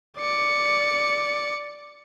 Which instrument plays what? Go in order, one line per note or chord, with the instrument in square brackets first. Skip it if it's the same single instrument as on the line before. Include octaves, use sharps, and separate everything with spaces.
[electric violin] D5 C#7